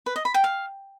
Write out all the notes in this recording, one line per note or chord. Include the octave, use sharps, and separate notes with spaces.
B4
D#5
B5
G5
F5